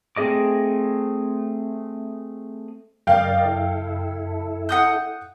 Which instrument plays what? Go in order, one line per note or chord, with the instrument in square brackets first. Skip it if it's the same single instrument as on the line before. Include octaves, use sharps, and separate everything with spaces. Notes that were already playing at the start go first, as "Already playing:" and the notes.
[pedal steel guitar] A3 C4 G#4 D#5 D6
[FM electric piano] F#2 C#3 [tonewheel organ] A#4 D5 D#5 [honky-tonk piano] F5 G5
[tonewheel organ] E4 A4
[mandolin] F#5 D#6 G6